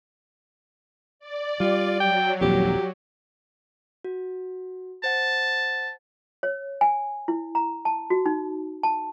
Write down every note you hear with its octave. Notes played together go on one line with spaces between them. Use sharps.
D5
G3 F4
F#3 G5
D#1 A#1 F2 G4
F#4
C5 F#5 A5
C#5
G#5
E4
A#5
A5
F#4
D#4
A5